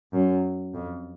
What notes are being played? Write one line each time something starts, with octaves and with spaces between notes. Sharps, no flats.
F#2
F2